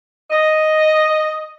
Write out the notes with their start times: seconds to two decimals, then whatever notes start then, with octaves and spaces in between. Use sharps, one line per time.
0.31 D#5